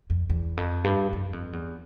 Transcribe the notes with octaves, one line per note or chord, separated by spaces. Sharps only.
F2
E2
F2
G2
F#2
F2
E2